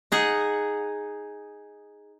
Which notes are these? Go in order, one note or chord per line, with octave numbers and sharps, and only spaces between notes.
D#4 G#4 F#5